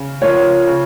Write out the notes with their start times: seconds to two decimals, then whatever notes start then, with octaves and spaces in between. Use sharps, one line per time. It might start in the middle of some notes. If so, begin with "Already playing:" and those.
Already playing: C#3
0.22 F3 A#3 F4 C#5
0.68 C#3